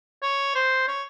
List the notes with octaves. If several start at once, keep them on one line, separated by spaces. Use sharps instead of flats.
C#5
C5
C#5